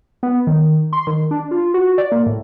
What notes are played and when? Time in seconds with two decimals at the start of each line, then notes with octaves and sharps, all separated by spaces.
0.23 B3
0.47 D#3
0.93 C6
1.07 D#3
1.31 D4
1.51 F4
1.74 F#4
1.98 D5
2.12 A#3
2.26 A2